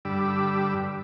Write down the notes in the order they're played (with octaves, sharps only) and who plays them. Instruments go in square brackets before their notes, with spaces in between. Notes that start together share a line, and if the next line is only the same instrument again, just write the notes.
[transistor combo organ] G2 D3 G3 B5 D6 E6